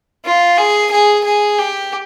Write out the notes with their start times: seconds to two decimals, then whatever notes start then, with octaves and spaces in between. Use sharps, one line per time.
0.25 F4
0.57 G#4
0.91 G#4
1.24 G#4
1.58 G4